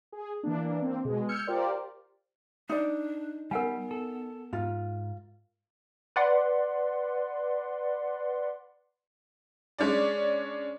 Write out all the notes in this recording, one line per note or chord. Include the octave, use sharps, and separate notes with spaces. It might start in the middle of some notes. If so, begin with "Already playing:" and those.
G#4
E3 A#3 D4
A#3 C4
B2 G#3
E6 F6 G6 G#6 C#7
F4 G4 A#4 C5 D5
D4 D#4 D5
G3 B3 A#4 F#5 G#5
A4
G#2 F4
B4 D5 F#5 C6
G#3 C#4 D4 D5